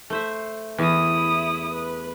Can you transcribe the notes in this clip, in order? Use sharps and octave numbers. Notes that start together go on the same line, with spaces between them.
A3 C5 E5
E2 E4 D#6
B4